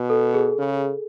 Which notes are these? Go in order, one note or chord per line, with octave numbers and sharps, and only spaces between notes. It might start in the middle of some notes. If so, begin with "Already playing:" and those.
Already playing: B2
A4
G#4
C#3